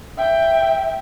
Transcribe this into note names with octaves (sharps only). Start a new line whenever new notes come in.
E5 G5